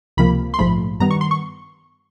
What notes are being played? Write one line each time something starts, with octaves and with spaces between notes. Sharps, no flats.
C#2 C3 F3 A#3 B5
C6
A#1 G#2 F3 A3 B5
G2 D#3 G3 B3 A#5
C#6
C6
C#6